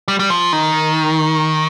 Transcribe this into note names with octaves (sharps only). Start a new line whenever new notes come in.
G3
G3
F3
D#3